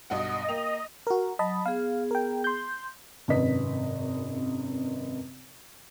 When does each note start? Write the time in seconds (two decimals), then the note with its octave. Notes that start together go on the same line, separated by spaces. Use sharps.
0.10 B1 G2 D#5 F#5
0.49 A#3 G5 F7
1.07 F#4 A#4
1.39 F#3 D#5 A5 B5
1.66 B3 G#4 F5
2.11 A#4 G5
2.44 C6 G6
3.28 G#1 F#2 C3 B4 D#5 B6